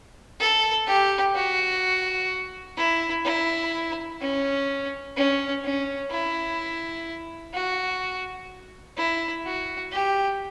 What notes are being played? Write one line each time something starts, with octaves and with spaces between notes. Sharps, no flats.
A4
G4
F#4
E4
E4
C#4
C#4
C#4
E4
F#4
E4
F#4
G4